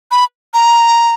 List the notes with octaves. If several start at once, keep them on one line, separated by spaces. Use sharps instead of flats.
B5
A#5